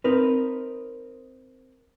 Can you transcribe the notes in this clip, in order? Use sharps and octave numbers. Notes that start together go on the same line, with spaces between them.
C4 D#4 A#4 B4